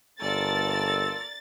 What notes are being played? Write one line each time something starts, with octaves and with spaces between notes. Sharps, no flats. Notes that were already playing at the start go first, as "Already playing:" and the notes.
G1 A#3 F4 A4 A#4 D5 A6